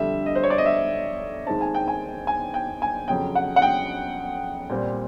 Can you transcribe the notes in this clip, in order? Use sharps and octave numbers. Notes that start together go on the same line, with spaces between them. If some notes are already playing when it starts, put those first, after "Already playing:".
Already playing: F2 D3 G3 E5
D#5
C5
C#5
D5
D#5
E5
D#2 D#3 G#3 C4 A5
G#5
G5
G#5
G#5
G5
G#5
F2 C#3 F#3 G5
F#5
F#5
G5
A#2 G3 C4